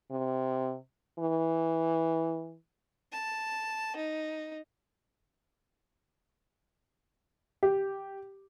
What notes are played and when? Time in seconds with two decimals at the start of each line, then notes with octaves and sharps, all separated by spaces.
0.11 C3
1.19 E3
3.12 A5
3.96 D#4
7.63 G4